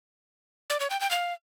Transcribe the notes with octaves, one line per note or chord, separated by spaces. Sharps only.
D5
C#5
G5
G5
F5